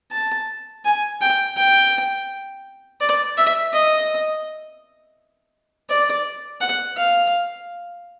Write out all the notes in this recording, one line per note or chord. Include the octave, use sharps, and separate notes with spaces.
A5
G#5
G5
G5
D5
E5
D#5
D5
F#5
F5